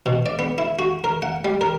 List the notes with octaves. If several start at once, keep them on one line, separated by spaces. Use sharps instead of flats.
B2
D5
B3
E4
F#4
A#4
F#5
G3
A#4